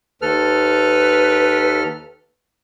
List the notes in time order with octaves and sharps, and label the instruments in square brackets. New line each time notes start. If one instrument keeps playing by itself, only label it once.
[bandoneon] D#2 A4 F6 [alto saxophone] B4